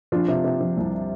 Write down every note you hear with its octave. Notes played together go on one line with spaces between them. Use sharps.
F3 D4 F4
C3
C3
F3
C2